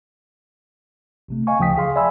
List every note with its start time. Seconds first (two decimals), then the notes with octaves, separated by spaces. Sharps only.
1.28 A1 C3 A3
1.47 D#5 F5 G#5 C#6
1.59 D2 C#3 F3 G5 D#6 B6
1.77 G#4 F5 C6
1.96 D5 E5 G#5 B5 E6